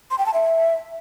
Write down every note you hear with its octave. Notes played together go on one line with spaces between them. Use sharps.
C6
G5
A5
E5